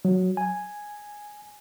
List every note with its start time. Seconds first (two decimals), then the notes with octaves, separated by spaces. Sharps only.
0.05 F#3
0.37 G#5